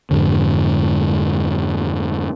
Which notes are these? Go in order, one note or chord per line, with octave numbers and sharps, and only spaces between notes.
F2 G#2 D3